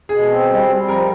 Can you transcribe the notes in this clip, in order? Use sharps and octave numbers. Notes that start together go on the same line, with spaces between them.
B2 G#4
C4
G3
G3
F3 A#4